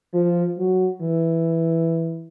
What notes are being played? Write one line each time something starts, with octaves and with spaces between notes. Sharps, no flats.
F3
F#3
E3